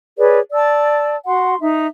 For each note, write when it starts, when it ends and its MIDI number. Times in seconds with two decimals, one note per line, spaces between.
0.19 0.40 68
0.19 0.40 71
0.19 0.40 73
0.19 0.40 74
0.53 1.15 74
0.53 1.15 81
0.53 1.15 88
1.26 1.55 66
1.26 1.55 78
1.26 1.55 84
1.61 1.87 63
1.61 1.87 76